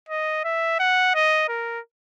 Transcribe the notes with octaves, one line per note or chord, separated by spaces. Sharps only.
D#5
E5
F#5
D#5
A#4